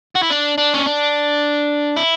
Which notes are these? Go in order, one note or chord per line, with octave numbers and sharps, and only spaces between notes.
F#4
E4
D4
D4
C#4
D4
E4